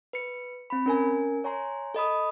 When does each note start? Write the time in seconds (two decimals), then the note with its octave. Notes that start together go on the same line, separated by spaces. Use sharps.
0.13 B4 C#7
0.70 C4 B5
0.86 C#4 A#4 G#5
1.44 C#5 G#5 A#5 C6
1.94 A4 D#5 B5 D#6